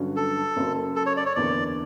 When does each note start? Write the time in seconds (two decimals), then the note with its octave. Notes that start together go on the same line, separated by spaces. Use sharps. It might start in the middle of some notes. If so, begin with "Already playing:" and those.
Already playing: G2 D3 F#3 C#4 F#4
0.16 A4
0.56 F#1 F#2 C#3 F#3
0.96 A4
1.06 C#5
1.17 D5
1.26 C#5
1.36 F#1 E2 D3 D5